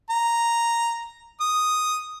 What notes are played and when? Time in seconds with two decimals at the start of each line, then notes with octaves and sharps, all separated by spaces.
0.10 A#5
1.41 D#6